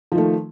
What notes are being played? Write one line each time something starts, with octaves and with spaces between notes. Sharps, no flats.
D#3 F3 A3